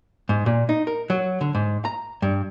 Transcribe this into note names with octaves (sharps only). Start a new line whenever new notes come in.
G#2
A#2
D#4
A#4
F#3
D3
G#2
A#5
G2